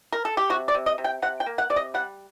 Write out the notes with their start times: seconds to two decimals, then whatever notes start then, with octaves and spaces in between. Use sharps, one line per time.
0.12 A#4
0.25 A4
0.37 G4
0.50 C3 F#4
0.68 D5
0.74 C3
0.86 D#5
0.98 C3
1.04 G5
1.22 C3 F#5
1.40 G5
1.46 A#3
1.58 F#5
1.70 C3 D5
1.76 D#5
1.94 G3 F#5